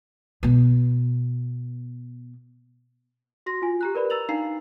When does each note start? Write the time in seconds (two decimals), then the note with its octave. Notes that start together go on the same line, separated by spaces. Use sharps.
0.43 B2 B3
3.46 F#4 C6 A#6
3.62 F4 G#5
3.81 G4 A#5 F#6
3.95 A#4 B4 D5 B5
4.10 A#5 E6 A6 F7 F#7
4.29 D4 D#4 F5 A#5 C7